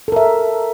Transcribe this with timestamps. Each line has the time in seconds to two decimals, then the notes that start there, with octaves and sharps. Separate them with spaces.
0.08 A4
0.12 A#4
0.16 E5